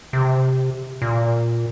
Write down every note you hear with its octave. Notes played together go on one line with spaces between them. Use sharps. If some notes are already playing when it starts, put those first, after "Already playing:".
C3
A#2